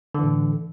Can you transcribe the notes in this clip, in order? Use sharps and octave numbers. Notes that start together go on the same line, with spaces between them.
A2 D3 E3